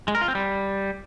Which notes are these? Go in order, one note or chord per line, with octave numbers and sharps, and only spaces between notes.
G#3
A#4
F4
C4
G3